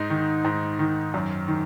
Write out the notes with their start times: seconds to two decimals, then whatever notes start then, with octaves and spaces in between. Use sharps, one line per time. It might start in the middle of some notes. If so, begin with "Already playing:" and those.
Already playing: G#2 D#4
0.10 D#3
0.45 G#2
0.79 D#3
1.14 F#2
1.48 D#3